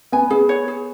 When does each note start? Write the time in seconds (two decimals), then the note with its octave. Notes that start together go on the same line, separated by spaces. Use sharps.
0.12 B3 G#5
0.30 B3 G#4
0.49 C#5
0.68 G#4